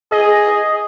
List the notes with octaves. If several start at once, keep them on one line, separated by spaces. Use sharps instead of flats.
G#4 D#5